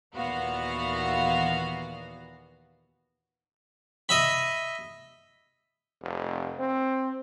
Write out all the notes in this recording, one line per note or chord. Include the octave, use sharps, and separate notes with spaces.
D#2 A#2 E3 B3 F#4 F5
D#5 E5 B5
F1
C4